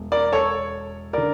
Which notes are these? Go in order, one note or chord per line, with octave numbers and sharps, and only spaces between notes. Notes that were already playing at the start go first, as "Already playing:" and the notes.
Already playing: E1
A#4 D5
A4 C#5
D3 A#4 D5